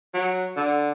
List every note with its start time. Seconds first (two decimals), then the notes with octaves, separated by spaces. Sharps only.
0.14 F#3
0.57 D3